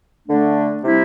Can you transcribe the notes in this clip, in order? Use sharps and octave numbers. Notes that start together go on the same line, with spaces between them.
D3 A3 D4
C3 G3 C4 E4